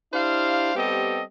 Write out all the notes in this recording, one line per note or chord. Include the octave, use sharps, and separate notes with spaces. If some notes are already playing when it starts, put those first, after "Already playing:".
D4 E4 G4 C5 F5
G3 B3 C4 G4 A4 D#5